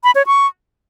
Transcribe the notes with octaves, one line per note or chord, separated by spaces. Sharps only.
B5
C#5
C#6